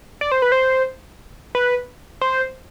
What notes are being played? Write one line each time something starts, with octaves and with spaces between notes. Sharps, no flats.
D5
C5
B4
C5
B4
C5